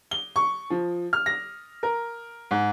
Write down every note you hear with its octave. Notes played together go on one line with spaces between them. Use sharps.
G7
C#6
F3
F6
A#6
A#4
G#2